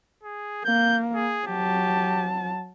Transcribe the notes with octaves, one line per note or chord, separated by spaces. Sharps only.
G#4
A#3 G6
G#4
F#3 G4 A5